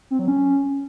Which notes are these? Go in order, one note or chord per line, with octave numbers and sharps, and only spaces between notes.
C4
F#3
C#4